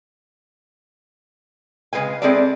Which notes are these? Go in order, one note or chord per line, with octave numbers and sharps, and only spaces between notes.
C#3 G#3 G#4 B4 G#5
G#3 C4 E4 G#4 A4 D5